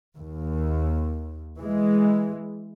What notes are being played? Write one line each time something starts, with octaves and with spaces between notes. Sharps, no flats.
D#2
E3 G#3